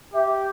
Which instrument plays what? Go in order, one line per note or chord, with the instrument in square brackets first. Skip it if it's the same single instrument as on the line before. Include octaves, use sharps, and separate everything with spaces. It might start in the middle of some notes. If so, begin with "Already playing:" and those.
[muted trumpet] G4 [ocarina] E5